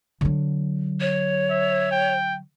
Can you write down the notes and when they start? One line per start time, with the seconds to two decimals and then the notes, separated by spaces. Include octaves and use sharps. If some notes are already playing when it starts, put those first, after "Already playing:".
0.21 D3 F#3
1.00 C#5
1.50 E5
1.91 G5